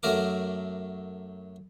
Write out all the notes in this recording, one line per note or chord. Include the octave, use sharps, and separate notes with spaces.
F#2 F#3 A3 A#4 D6